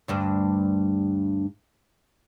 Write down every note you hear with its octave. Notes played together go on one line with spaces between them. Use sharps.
D2 G2 D4